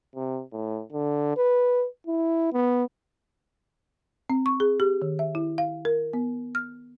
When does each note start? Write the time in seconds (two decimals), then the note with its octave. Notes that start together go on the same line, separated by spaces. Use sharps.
0.16 C3
0.52 A2
0.93 D3
1.37 B4
2.07 E4
2.53 B3
4.29 C4
4.46 C#6
4.60 G#4
4.80 G4
5.02 D#3
5.19 E5
5.35 E4
5.58 F5
5.85 A#4
6.13 B3
6.55 F6